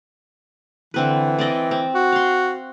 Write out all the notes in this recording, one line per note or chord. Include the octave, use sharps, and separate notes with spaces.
D3 E3 C4 B4
C4 D5 D#5
C4
F#4
F5 C6